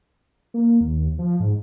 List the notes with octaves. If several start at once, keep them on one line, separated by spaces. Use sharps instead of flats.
A#3
D#2
F3
G#2